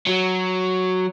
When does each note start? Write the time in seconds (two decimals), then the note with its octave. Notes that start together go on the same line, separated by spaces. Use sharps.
0.07 F#3